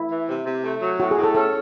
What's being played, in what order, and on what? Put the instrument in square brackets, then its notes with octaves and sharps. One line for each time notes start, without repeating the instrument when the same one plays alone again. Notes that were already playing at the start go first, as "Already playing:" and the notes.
Already playing: [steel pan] E4
[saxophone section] E3
C3
C3
A3
F#3
[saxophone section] A2 [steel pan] F#4
[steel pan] G#4
[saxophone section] A2
[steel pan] A4
[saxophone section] C#4 [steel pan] A4